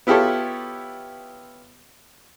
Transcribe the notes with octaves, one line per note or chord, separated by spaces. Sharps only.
B3 E4 F4 G4 A4 C#5